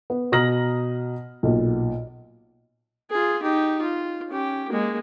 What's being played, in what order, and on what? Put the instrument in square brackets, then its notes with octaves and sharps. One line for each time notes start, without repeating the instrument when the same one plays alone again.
[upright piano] B3
B2 A#5 D#6 F6 A#6 F#7
B1 A#2
[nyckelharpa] F4 G#4
D#4 G4
F4
C#4 G4
G#3 A#3